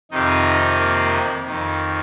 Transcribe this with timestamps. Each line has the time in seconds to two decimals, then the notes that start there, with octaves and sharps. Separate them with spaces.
0.11 F2 C3 D#3 D#4
0.78 A#3
1.46 F2 D#3